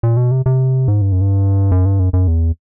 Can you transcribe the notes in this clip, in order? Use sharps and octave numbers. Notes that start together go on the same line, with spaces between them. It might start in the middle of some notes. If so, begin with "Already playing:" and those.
A#2
B2
C3
C3
G#2
G2
F#2
G2
F#2
G2
F#2
F#2
E2